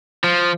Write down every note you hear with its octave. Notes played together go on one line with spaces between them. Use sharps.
F3